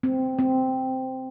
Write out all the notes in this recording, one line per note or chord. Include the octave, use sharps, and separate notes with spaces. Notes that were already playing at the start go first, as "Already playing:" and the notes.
C4
C4